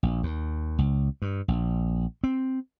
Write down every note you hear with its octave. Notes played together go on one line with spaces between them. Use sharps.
A#1
D#2
C#2
G2
A#1
C4